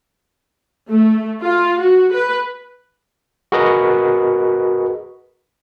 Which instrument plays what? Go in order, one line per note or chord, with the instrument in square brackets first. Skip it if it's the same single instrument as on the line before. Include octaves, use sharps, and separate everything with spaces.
[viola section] A3
F4
F#4
B4
[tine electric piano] F#4 G#4 A#4 B4 D#5